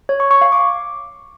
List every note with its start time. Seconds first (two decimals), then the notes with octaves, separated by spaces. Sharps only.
0.09 C#5
0.20 C#6
0.31 C#6
0.41 F5
0.52 D6